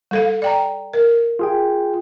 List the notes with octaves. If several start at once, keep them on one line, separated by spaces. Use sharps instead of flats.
G3 A4 F5
D5 G5 A#5
A#4
F4 G#4 G5